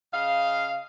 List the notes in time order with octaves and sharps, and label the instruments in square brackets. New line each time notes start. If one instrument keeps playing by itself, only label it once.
[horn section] C#3 D#5 F5